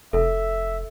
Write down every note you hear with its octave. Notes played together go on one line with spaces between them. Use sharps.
F1 A4 E5